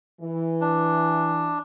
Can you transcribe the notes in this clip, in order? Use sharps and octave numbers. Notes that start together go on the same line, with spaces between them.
E3
D4